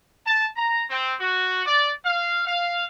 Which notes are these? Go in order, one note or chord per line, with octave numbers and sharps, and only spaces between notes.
A5
A#5
C4
F#4
D5
F5
F5